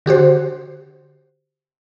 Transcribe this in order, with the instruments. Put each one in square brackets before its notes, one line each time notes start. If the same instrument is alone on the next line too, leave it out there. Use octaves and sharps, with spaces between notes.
[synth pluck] D3 F#4 G4 C5